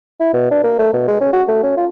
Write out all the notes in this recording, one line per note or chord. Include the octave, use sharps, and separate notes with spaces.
E4
B2
D4
A#3
A3
B2
G#3
C#4
F#4
A3
C#4
F4